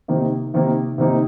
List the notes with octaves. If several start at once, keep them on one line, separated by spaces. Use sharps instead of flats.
C3 D#3 A#3 D#4
C3 D#3 A#3 D#4
C3 D#3 A#3 D#4